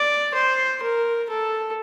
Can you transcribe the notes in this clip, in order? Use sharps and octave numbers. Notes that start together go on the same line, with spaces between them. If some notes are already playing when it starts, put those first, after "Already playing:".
Already playing: D5
C5
A#4
A4